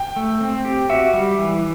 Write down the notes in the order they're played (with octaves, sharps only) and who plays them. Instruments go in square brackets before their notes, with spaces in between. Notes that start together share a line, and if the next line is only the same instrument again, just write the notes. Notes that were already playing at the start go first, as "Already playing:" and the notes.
Already playing: [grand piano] G5
[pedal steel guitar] A3
C4
G4
[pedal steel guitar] F#4 [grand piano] E5
[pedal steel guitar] G3
E3